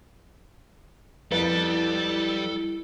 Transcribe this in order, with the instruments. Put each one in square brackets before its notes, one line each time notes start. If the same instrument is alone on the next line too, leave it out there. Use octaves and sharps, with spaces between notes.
[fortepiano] F2 B3 [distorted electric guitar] G3 [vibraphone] E4 [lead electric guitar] A4